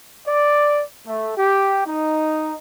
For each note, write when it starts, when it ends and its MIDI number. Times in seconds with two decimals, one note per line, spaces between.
0.26 0.82 74
1.06 1.36 57
1.37 1.84 67
1.86 2.57 63